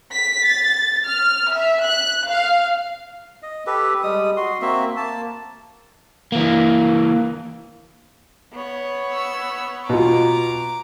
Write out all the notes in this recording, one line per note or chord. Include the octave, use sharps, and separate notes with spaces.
B6
A6
F6
E5
F#6
F5
D#5
G4 A4 B4
G3 G#3 D#6
F#4 C6
A#3 C4 F#4 E5
A#3 A5
E3 A#3
B3 C#5
E6
B2 F4 A#5 D6